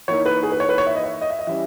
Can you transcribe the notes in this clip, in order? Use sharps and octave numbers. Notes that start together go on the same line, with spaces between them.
E3 A#3 D#4 C#5
B4
G#4
B4
C#5
B4
C#5
E5
D#5
E5
D#5
E5
D#5
E3 G3 C#4 E5